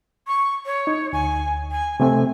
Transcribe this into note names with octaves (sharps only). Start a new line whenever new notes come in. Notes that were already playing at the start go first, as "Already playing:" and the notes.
C#6
C#5
D#4
D2 G#5
G#5
C3 A3 C4 G#5